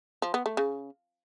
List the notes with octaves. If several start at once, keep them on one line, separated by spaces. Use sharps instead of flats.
F3
B3
A3
C#3